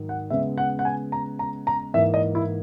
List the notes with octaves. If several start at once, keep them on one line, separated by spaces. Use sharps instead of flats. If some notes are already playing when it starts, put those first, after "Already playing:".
Already playing: G#2 D#3 F#3
F#5
C#3 G#3 B3 E5
F#5
F#5
G#5
A#5
A#5
A#5
G#2 E3 A#3 E5
D#5
E4